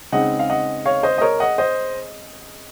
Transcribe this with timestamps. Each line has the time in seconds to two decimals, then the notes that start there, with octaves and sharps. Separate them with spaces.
0.12 C#3 G#3 C4 D#4 D#5 F#5
0.39 F5
0.50 D#5 F#5
0.85 C#5 F5
1.03 C5 D#5
1.18 D#5
1.21 A#4 C#5
1.40 D#5 F#5
1.58 C5 D#5